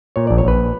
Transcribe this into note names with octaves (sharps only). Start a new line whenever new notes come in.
A#2 C#5
A#1 D5
C#5
A#1 B4